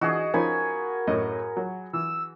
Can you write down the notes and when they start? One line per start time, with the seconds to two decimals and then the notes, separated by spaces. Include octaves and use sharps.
0.01 E3 D4 F#4 G#4 D#5
0.34 F3 C#4 D#4 A#4 G#5 B5
1.07 F#2 A2 D#5
1.57 F#3
1.93 E3 E6